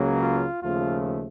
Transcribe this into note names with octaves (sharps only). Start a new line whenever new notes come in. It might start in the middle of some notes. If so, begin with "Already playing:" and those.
Already playing: C#2 C#3 F#3 A#3
F4
D#2 C#3 F3 A3 F4